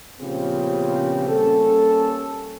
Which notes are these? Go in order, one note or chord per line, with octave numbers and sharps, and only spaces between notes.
A#2 C#3 F3 B3 C4 G4
G3 A#3 C#4 A4